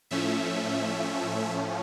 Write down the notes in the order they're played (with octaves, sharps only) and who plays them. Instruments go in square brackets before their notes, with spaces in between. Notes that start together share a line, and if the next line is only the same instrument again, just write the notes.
[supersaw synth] A2 F3 A3 C#4 E5